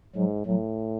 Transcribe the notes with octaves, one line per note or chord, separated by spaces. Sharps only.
G#2 F#3
A2 F#3